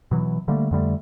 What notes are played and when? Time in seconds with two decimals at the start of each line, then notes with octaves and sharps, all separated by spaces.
0.11 B2 E3 F#3
0.48 D3 G3 A3 A#3
0.71 F2 D3 G3 A3